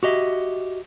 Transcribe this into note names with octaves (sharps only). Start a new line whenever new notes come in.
F#4 G4 D#5 E5